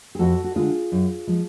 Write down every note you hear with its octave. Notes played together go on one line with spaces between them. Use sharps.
G#4
F2 F#4 A4
F#4
D3 G#3 F4 G#4
F#2
F3 G#3